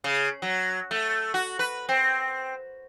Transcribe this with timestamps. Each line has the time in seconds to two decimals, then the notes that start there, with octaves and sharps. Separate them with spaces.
0.04 C#3
0.42 F#3
0.91 A3
1.34 F#4
1.59 B4
1.89 C4